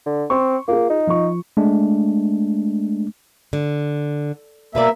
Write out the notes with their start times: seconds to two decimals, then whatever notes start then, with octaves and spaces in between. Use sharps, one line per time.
0.06 D3
0.30 C4 C6 C#6
0.68 A#3 F4 G#4
0.90 D#4
1.07 F3 C#6
1.57 G#3 A3 D4
3.53 D3
4.75 B2 A#3 B4 D5 E5